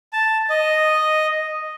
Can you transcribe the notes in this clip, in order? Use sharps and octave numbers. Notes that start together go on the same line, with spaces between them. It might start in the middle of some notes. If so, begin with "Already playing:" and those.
A5
D#5